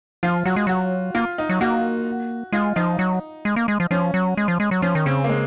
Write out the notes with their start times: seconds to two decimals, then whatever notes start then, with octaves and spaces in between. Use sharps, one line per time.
0.23 F3 F4
0.45 F#3 F#4
0.56 G#3
0.67 F#3 F#4
1.15 A#3 F4
1.38 D#4
1.49 F#3
1.61 A#3 F#4
2.52 G#3 F4
2.76 F3 D#4
2.99 F#3
3.45 G#3
3.56 A#3
3.68 G#3
3.80 F3
3.91 F3 C#4
4.14 F#3
4.37 G#3
4.48 F3
4.60 G#3
4.71 F#3
4.82 F3 C#4
4.95 D#3
5.06 C#3 C4
5.24 A#3
5.29 G#3